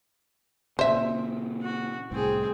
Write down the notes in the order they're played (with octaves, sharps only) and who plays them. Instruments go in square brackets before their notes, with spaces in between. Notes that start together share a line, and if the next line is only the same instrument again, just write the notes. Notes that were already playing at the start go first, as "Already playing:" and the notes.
[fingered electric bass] A#2 C#3 [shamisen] C5 E5
[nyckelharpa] F#4
[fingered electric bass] C2 A2 [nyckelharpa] C4 G#4